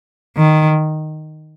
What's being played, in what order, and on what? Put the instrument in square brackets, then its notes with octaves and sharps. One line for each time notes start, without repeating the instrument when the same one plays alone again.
[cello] D#3